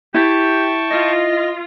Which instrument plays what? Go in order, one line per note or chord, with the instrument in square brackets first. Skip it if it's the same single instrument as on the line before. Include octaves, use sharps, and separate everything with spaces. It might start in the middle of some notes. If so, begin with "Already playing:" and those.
[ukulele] E4 [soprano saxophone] G4 [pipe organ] G5 A5 C#6
[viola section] F4 [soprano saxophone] D#5